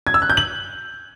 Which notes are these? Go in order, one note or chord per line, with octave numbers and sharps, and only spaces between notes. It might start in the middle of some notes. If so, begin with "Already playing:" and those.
G#6
E6
F#6
G6
F#7